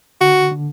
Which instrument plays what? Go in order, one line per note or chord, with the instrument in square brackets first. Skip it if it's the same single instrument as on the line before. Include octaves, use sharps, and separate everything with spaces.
[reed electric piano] D3 [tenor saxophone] F#4
[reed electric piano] D3